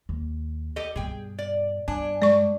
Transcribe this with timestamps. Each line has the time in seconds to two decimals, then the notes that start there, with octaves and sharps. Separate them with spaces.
0.09 D#2
0.76 G4 A4 D#5
0.96 G2 B2 G#4 G5
1.39 D5
1.88 G2 D4 G#5
2.22 G#3 D5 C#6